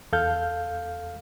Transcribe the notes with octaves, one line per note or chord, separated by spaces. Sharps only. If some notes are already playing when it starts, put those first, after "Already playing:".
E2 A4 F5 F6 G6